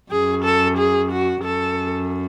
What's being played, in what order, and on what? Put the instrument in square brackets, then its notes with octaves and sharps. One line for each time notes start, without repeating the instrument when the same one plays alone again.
[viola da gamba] F#2 [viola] G#4
[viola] A4
G#4
F#4
[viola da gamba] F#2 [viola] A4